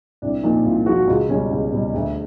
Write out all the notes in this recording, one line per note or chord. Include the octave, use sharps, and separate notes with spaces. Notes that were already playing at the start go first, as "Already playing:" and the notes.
C2 D4
A#2 F3 D#4
C2 F4
A#2 F3 F#4
C#2 F4
B2 G3 C#4
C#2
B2 G3
D2